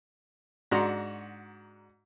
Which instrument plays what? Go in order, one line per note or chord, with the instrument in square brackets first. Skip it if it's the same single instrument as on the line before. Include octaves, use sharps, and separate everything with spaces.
[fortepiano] G#2 D4 F#4 A#5 C6